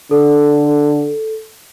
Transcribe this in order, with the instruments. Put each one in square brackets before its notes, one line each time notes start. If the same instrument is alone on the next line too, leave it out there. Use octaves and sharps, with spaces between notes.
[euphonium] D3 [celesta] A4